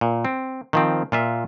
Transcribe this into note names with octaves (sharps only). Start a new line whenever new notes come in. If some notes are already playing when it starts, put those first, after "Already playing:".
A#2
C4
D#3 F3 C4
A#2 F4 E5